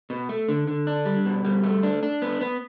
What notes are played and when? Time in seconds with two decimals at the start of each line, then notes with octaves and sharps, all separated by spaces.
0.10 B2
0.29 A3
0.49 D3
0.67 D3
0.87 D4
1.05 G3
1.26 B2
1.45 G3
1.63 A3
1.83 D4
2.03 D4
2.22 B3
2.41 B3